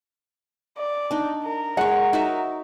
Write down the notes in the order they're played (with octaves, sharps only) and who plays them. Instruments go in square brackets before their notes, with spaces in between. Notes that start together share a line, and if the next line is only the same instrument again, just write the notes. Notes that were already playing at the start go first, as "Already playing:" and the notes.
[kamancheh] D5
[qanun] D4 D#4
[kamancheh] A#4
[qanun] G#3 C#5 [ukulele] F#5
[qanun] D#4 F#4 E5